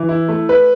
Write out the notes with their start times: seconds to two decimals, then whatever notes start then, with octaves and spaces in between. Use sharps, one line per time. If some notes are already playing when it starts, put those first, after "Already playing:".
Already playing: E3
0.09 E4
0.28 A3
0.49 B4